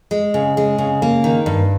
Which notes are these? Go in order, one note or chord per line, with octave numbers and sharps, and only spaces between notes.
G#3
C#3
G#3
C#3
A#3
D#3
G2